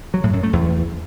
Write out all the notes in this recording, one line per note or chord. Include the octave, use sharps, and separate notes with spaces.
F#3
A2
F#2
A3
E2